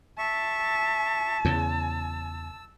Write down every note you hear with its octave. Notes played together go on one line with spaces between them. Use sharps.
E5 A5 C#6
E2 C#3 E6